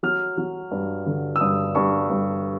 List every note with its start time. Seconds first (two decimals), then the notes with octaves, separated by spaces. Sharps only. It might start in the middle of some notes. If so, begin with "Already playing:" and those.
0.03 F#3 F6
0.37 F#3
0.71 G2
1.06 D3
1.36 E6
1.40 G2 D#6
1.75 G2 C#6
2.10 G2